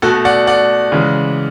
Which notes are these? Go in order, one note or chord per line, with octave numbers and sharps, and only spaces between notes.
B2 A3 F#4 A4
D5 F#5
D5 F#5
C#3 E3 G#3